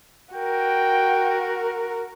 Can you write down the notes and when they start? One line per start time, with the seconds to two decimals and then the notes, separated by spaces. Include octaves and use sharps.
0.35 F#4 A#4 G5